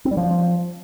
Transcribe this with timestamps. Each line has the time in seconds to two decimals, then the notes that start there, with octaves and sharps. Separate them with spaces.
0.05 C4
0.11 G3
0.17 F3